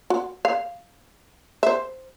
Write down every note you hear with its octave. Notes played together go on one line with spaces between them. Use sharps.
F#4
F5
C5 E5